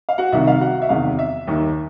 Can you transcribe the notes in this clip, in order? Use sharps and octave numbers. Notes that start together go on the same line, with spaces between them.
F5
F#4 F#5
C2 C3 D#3 E5
F5
F#4 F#5
E5
E2 C3 D#3 F5
E5
D#2 D#3